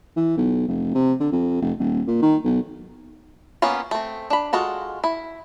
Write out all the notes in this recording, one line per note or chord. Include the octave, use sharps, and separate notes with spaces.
E3
B1
F1
C3
D3
F2
F1
D#1
A#2
D#3
B1
A#3 B3 C#4 F4
A3 C4
D4 B5
G#3 F4 F#4 A4
E4